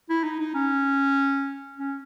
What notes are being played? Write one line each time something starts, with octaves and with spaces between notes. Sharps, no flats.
E4
D#4
D#4
C#4
C#4